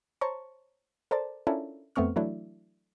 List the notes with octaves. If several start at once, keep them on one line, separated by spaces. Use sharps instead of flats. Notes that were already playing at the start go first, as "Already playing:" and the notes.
C5 C#5 A5 A#5 C#6
A4 A#4 C5 D5 A5
C#4 D4 E4 F4 A4 A#4
F2 A3 B3 C4 C#6 F6
E3 F#3 A3 D4 E4